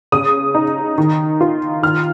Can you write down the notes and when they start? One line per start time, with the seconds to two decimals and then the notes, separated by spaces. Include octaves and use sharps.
0.12 C#3 D#6
0.55 D#4
0.98 D#3
1.41 F4
1.82 D#3 F6